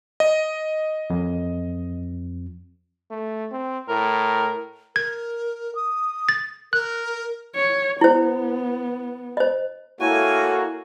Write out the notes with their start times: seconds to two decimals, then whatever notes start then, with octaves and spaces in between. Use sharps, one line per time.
0.20 D#5
1.10 F2
3.10 A3
3.52 C4
3.89 A2 A#4
4.96 A#4 G#6
5.75 D#6
6.29 A6
6.73 A#4 F#6
7.55 C#5
8.01 B3 E4 C5
9.37 C5 D#5
10.01 A#3 E4 F#4 A4 C#5 G#5